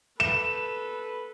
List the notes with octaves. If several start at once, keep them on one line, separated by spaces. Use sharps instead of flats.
A4 B4 E7